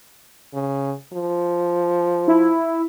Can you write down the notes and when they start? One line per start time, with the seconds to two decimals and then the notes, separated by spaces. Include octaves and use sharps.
0.54 C#3
1.13 F3
2.28 E4